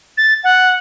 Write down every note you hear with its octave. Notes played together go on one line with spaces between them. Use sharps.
A6
F#5